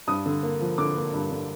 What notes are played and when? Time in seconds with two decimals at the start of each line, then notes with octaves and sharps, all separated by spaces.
0.07 G2 D#6
0.26 D3
0.43 A#3
0.61 F3
0.78 D3 D6
0.95 A#3
1.14 G2
1.31 D3